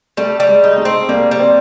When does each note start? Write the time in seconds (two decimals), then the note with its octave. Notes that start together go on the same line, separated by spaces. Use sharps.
0.17 G3 A3
0.40 G3
0.48 G#3
0.64 D#4
0.78 A3
0.85 C4
1.09 G3 A#3
1.31 G3
1.40 C4